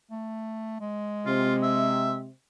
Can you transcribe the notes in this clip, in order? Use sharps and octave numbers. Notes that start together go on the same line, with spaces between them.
A3
G#3
C3 F4
E5